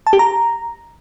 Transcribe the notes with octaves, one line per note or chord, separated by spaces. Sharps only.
A5
G4
A#5